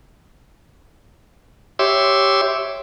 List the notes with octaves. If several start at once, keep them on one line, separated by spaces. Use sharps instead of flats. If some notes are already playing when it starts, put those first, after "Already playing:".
G4 C#5 E5 C6 D6 E6